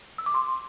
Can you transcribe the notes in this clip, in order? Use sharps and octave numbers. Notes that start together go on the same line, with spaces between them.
E6
D6
C6